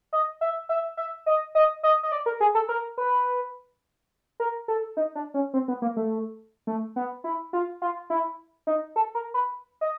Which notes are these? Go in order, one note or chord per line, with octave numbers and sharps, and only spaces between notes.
D#5
E5
E5
E5
D#5
D#5
D#5
D#5
D5
A#4
G#4
A4
A#4
B4
A#4
A4
D#4
D4
C#4
C4
B3
A#3
A3
A3
B3
E4
F4
F4
E4
D#4
A4
A#4
B4
D#5